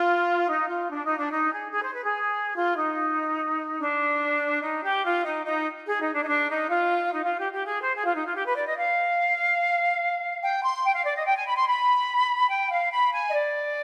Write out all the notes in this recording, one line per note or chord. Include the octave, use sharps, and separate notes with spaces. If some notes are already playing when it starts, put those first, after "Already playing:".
Already playing: F4
D#4
F4
D4
D#4
D4
D#4
G#4
G#4
C5
B4
G#4
F4
D#4
D4
D#4
G4
F4
D#4
D#4
G#4
D#4
D4
D#4
D4
D#4
F4
D#4
F4
G4
G4
G#4
C5
G#4
F4
D#4
F4
G4
B4
D5
D#5
F5
G5
C6
G5
F5
D5
D#5
G5
G#5
B5
C6
B5
G5
F5
B5
G#5
D#5
D5